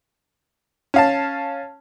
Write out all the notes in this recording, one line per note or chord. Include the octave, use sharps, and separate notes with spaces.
C#4 F5 A5